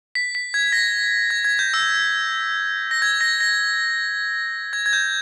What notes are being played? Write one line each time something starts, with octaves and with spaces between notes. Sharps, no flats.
B6
B6
G#6
A#6
G#6
G#6
G6
E6
A#6
G#6
A#6
A#6
G#6
G#6
G6